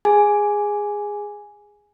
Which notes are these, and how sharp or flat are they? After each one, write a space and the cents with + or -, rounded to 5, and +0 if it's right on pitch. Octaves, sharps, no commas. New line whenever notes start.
G#4 -15 G#5 +0